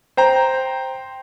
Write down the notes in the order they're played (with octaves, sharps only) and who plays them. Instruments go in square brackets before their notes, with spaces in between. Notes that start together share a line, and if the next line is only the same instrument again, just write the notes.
[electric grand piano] C5 G5 A#5